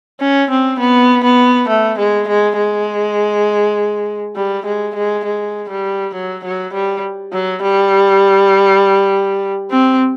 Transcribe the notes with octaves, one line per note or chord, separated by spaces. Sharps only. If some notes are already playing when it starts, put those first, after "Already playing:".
C#4
C4
B3
B3
A3
G#3
G#3
G#3
G3
G#3
G#3
G#3
G3
F#3
F#3
G3
F#3
G3
C4